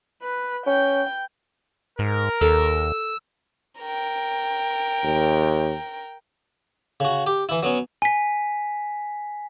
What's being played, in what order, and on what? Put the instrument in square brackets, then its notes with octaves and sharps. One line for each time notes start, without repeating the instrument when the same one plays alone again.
[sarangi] B4
[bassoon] C#4 [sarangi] G5
[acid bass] G#2 [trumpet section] A#4
[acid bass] D#2 [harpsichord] A4 [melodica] E6
[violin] A#4 G5
[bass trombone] D#2
[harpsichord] C#3 F#4
G4
E3 E4
F#3 B3 C#4
[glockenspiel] G#5 B6